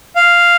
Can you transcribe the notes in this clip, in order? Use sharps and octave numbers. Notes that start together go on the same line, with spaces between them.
F5